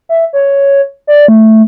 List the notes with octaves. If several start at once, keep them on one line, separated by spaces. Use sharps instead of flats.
E5
C#5
D5
A3